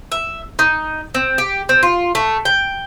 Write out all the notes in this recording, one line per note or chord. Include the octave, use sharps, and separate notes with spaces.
E5
D#4
C4
G4
C4
F4
A3
G5